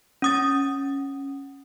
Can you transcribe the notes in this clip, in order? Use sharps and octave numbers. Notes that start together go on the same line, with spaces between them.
C#4 D#6 A6